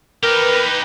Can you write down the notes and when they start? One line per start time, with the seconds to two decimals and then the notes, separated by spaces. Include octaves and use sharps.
0.23 D#4 G4 A#4 B4